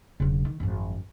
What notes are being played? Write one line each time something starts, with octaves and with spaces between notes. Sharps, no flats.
E1 C#3 F#3
D#3
G#1 F#2 F3